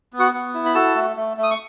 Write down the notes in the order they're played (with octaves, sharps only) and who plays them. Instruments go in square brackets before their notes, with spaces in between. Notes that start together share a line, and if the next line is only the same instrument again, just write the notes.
[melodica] B3
F#4 F#5
B3
E4
B5
F#4 A4 A5
A3
A3
A3
D#6
C#6